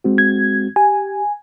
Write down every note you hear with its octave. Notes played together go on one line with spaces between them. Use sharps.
G#3 C4 F#4
G#6
G4 G#5